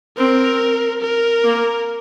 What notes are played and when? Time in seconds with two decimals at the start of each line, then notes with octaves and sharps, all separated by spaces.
0.17 C4 A#4
1.02 A#4
1.44 A#3